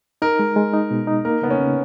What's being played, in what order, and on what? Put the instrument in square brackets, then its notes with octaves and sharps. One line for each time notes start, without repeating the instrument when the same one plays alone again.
[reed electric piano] D#4 [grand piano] A#4
[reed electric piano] G#3
G#3
D#4
B2
D#4
[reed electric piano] A#3 [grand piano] A#4
[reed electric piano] C#3 [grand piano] B3
[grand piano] C#4
[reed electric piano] C#3